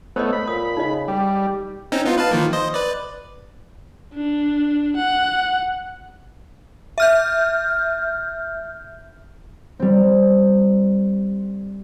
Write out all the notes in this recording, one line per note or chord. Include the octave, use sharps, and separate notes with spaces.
A3 B3 C5 C#5 D#5
B5
A#2 D#6
C#3 D#4 D#5
G3 G4
C4 C#4 D#4
B3 D#4 F4
B4 F5 A5
D#3 F3 A#3
C5 D#5
B4 D5
D4
F#5
E5 F6 G6
G3 C4